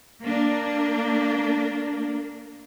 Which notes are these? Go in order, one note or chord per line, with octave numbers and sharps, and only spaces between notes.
A#3 D4